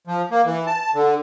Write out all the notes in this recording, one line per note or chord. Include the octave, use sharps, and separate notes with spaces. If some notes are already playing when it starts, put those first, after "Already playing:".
F3
A#3
E3
A5
D3